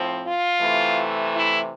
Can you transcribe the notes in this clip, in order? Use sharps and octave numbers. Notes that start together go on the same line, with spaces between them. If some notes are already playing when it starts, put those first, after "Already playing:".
Already playing: A2 F3 C4
F4
C3 E3 A3
E4